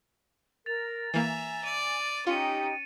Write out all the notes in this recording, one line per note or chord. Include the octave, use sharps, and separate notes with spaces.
A#4 A6 F7
E3 A#3 E5 G#5 A#5
D5 D#7
C#4 D#4 F4 G4 G5 C#7 D#7